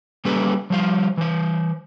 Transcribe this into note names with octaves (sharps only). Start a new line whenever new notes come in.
G3 A#3 C#4 G4 A4 B4
F3 G3 C5 F5
E3 C5